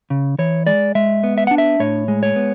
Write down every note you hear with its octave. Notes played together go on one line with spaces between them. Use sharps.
C#3
E3 C#5
G#3 D5
G#3 E5
B3
E5
D4 F#5
E5
A2 C#5
G#3
C#5
B3